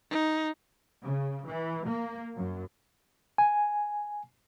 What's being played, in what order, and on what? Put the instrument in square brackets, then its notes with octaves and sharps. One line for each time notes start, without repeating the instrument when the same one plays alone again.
[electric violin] D#4
[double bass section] C#3
E3
A#3
F#2
[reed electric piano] G#5